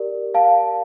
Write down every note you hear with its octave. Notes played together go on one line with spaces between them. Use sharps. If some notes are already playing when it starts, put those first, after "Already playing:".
Already playing: G4 A#4 D5
F5 A5